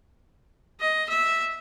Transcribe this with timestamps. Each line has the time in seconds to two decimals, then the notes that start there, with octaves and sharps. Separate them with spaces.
0.80 D#5
1.10 E5